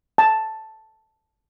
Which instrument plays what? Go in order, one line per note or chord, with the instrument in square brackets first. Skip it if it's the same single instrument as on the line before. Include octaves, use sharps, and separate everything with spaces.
[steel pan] A5